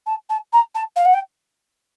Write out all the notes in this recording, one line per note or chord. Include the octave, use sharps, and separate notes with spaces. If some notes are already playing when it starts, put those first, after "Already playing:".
A5
A5
A#5
A5
F5
F#5
G5